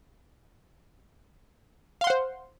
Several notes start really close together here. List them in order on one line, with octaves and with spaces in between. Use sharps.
F5 C6 F#5 C5